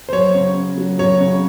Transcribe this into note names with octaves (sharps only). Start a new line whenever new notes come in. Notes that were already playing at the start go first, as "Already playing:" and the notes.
C5
F#3 C#5
C#3
C#3
F#3
F#3 C#5
C#3